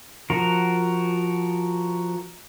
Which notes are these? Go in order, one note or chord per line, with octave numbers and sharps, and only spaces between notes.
F3 F#4 A#4